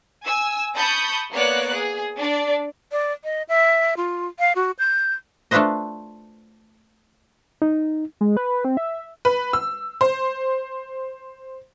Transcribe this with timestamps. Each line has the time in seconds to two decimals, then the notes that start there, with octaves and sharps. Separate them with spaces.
0.25 G#5 E6
0.75 A5 B5 C#6 D#6 G6
1.32 A#3 B3 C#5 D5 F#6
1.72 G#4
2.16 D4 D5
2.92 D5
3.24 D#5
3.48 E5
3.97 F4
4.39 F5
4.55 F#4
4.79 G6
5.51 A3 D4 F4 B4 C5 D#5
7.62 D#4
8.21 G#3
8.37 B4
8.65 C4
8.77 E5
9.25 B4
9.53 E6
10.01 C5